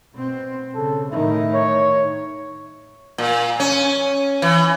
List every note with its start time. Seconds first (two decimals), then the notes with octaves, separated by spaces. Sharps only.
0.14 B2 C4
0.75 C#3 A4
1.12 A2 D#3 E4
1.54 C#5
3.18 A#2
3.60 C#4
4.42 E3